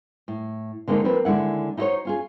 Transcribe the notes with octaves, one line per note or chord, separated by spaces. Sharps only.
A2
D3 G#3 A#3 C4 D#4
F3 A#3 C4 B4
D#2 D3 G#3 E4 F#5
D#4 E4 F#4 A#4 C5 C#5
C#4 F4 G#4